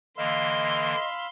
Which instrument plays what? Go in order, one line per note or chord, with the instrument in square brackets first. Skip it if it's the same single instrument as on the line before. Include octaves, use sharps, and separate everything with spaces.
[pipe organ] D3 E3 A#3 [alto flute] D#5 [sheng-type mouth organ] F5 B5 E6 [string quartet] C6